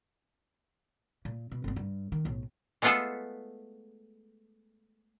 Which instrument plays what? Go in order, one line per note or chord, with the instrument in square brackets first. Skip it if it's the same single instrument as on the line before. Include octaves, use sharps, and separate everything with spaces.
[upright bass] A#2
B2
G#1 B3
G2
D#3
B1 A2
[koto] G#3 A3 B3 F4 G#4 A4